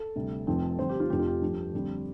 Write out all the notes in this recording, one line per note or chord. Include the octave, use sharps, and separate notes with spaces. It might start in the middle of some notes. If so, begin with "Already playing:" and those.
Already playing: A4
D2 C3 G3
F1 F2 F3 C4
G2 D3 F3 C4 C5
G4
F4
F1 F2 F3 C4 G4
F4
G4
G2 F3 A3
F2 D3 G3 C4